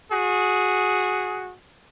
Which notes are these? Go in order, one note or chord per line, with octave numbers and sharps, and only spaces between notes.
F#4 G#4